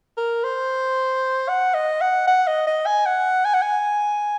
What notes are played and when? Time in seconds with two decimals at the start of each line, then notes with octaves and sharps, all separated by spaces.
0.17 A#4
0.44 C5
1.49 F#5
1.74 D#5
2.01 F#5
2.27 F#5
2.47 D#5
2.67 D#5
2.86 G#5
3.06 F#5
3.45 G#5
3.54 F#5
3.62 G#5